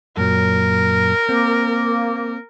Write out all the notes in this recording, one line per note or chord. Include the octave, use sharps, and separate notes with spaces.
F#2 A#2 F#3 A#4
A#3 C4